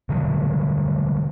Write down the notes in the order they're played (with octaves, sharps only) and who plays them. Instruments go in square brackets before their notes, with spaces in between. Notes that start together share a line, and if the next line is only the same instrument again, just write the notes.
[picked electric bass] B2 D3 F#3 G3